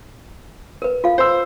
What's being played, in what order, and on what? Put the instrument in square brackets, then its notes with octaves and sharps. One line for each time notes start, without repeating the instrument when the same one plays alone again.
[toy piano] A#4 B4
F4 A4 F5
[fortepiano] C5 E6